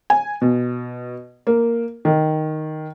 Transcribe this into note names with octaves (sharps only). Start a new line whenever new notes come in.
G#5
B2
A#3
D#3